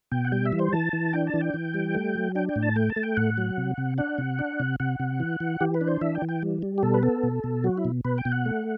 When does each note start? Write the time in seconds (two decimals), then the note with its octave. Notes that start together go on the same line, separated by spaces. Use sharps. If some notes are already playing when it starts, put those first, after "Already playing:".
0.11 B2 G5
0.25 F#5
0.32 G3 G5
0.45 E5
0.52 E3
0.59 C5
0.73 E3 A5
0.93 E3
1.13 D4 G5
1.27 A5
1.34 E3
1.41 G5
1.54 E3
1.74 G3
1.95 A3
2.15 F#3
2.35 D4 G5
2.49 G5
2.56 A2
2.62 A5
2.76 A3 G5
2.90 A5
2.96 A3
3.03 G5
3.17 A2 F#5
3.38 F#3
3.58 C3
3.78 C3
3.98 D4 F#5
4.18 C3
4.39 D4
4.60 C3
4.80 C3 F#5
5.00 C3
5.20 E3
5.40 E3
5.61 E3 G4
5.74 B4
5.81 D4
5.88 C5
6.01 E3 E5
6.15 G5
6.22 E3
6.29 G5
6.42 G3
6.62 G3
6.78 G4
6.83 B2 A4
6.94 B4
7.03 B3 A4
7.23 B2
7.44 B2
7.64 F#3 F#4
7.77 E4
7.85 B2
8.05 B2 B4
8.18 G5
8.25 B2
8.32 F#5
8.46 A3